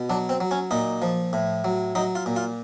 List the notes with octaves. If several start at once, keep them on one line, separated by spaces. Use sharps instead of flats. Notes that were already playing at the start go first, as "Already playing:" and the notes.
Already playing: B2
F#3 D4
C4
F#3
C#4
A#2 D#4
F3
A2
F#3
F#3 D#4
F4
A#2
F4